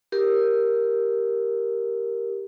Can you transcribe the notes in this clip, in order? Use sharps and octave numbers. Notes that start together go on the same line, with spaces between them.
G4 A#4